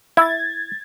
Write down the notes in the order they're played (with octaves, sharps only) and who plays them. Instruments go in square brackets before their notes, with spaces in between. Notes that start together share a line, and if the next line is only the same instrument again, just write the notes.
[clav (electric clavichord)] E4 [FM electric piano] G#6 A6